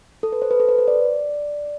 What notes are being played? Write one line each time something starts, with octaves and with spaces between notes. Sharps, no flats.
A4
B4
C5
B4
A4
B4
C5
D5